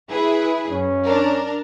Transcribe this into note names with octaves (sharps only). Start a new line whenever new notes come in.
E4 G#4 B4
F#2 C#4
D4 A#4